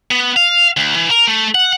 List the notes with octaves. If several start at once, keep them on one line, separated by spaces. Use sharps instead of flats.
B3
F5
D2
E3
A#4
A3
F#5